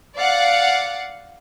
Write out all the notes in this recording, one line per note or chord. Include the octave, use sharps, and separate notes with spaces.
D5 F5 F#5